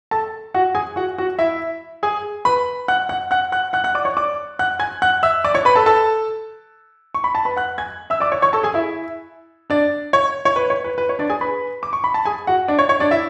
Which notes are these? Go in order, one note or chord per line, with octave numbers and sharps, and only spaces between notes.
A4 A5
F#4 F#5
G#4 G#5
F#4 F#5
F#4 F#5
E4 E5
G#4 G#5
B4 B5
F#5 F#6
F#5 F#6
F#5 F#6
F#5 F#6
F#5 F#6
F#5 F#6
D5 D6
C#5 C#6
D5 D6
F#5 F#6
G#5 G#6
F#5 F#6
E5 E6
D5 D6
C#5 C#6
B4 B5
A4 A5
A4 A5
C#6
B5
A5
B4 B5
F#5 F#6
G#5 G#6
E5 E6
D5 D6
C#5 C#6
C#5 C#6
A4 A5
G#4 G#5
E4 E5
D4 D5
C#5
C#5
B4
C#5
B4
B4
C#5
D4 D5
G#4 G#5
B4 B5
D6
C#6
B5
A5
G#4 G#5
F#4 F#5
D4 D5
C#5
C#5
D4 D5
E4 E5